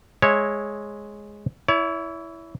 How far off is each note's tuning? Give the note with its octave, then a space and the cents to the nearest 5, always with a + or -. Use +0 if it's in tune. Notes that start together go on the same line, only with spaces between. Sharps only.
G#3 +0 C#5 -10 E5 -5
E4 +0 C#5 +40